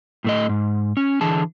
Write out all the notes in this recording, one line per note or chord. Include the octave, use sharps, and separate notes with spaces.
A2 A3 D#5
G#2
C#4
D3 E3 G#4 A5